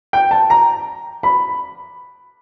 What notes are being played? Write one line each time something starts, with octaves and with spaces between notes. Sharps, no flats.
G5
A5
A#5
B5